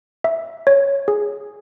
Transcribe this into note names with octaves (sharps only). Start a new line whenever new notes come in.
E5
C#5
G#4